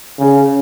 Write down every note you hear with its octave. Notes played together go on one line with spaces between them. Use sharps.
C#3